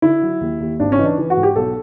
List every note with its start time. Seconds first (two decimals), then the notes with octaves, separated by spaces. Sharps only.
0.02 D3 E4
0.22 F#3
0.41 D#2
0.60 D#2
0.80 G#1 D4
0.92 C#4
0.98 E3 D#4
1.05 D4
1.18 E3
1.30 F#4
1.37 G#2
1.43 G4
1.56 B1 A4